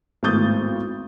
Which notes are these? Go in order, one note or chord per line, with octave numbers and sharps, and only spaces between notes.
G#1 A2 B3 D#6 G6 A6